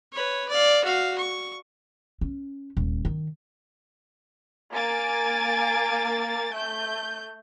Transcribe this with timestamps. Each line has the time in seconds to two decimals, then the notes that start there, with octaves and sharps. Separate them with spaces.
0.12 B4 C#5
0.48 D5 F5
0.84 F#4 F5
1.18 C#6
2.21 C#4
2.77 D#1
3.05 D#3
4.73 A#3 G#5 A6 D7
6.54 A3 G6